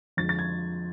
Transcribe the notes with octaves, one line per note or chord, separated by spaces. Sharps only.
F2 D3 F3 G#3 A6
A6
G#6